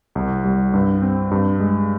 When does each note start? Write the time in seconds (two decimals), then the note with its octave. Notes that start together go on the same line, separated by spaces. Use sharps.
0.15 C2
0.45 G3
0.74 G2
1.02 C4
1.31 G2
1.60 G#3